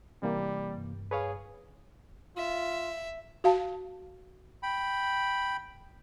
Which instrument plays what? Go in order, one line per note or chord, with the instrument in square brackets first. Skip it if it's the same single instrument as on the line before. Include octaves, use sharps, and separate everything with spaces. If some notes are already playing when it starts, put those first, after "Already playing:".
[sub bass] F1 [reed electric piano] C3 E3 A#3 [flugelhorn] G3
[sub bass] G2
[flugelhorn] G#4 [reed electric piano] B4 C#5 F5
[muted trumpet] F4 [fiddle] E5
[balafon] F#4 F5 A5
[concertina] G5 B5